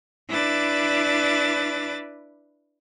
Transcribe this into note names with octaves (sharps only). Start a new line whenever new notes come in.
D4 E4 B4 D6 A6